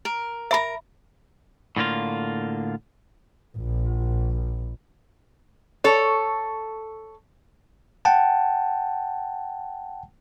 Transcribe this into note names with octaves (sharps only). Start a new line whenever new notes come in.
A#4
A#4 E5 A#5 B5
A2 D3 A#3 F4
A#1
A4 C#5
F#5 G5 A5